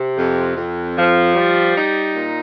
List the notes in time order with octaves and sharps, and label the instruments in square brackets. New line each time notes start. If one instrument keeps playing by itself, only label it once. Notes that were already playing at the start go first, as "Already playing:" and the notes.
Already playing: [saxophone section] C3
F2
F2
F3
G3
D#4
A#2